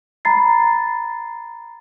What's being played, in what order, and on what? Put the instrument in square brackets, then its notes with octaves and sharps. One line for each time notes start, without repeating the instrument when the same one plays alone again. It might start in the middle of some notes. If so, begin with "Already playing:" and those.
[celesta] A#5 B5 A6 C7